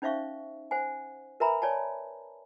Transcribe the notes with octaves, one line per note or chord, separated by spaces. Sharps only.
C#4 D#4 C5 E5 F5 C#6
C5 F#5 G#5
A#4 B4 E5 G#5 A#5 B5
C#5 D5 G#5 A5